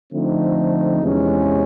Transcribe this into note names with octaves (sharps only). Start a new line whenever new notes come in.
D3 F3 A3 C4 D#4
E2 C3 E3 G#3 C#4